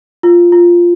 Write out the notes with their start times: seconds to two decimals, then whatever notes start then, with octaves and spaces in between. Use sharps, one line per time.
0.23 F4
0.52 F4